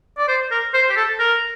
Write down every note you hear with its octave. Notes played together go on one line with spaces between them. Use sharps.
D5
C5
A#4
C5
G4
A4
A#4